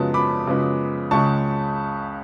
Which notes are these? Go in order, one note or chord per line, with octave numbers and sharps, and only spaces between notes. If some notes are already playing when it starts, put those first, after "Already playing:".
Already playing: F#2 C#3 F3 G#3 B3 A5
B5 D6
F#2 C#3 F3 G#3 B3
C#2 C#3 G#3 A5 C#6